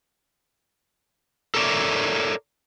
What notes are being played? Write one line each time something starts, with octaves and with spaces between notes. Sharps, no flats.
A4 A#4 C#5 D5 E5